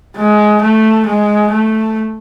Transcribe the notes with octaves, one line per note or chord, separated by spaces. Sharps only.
G#3
A3
G#3
A3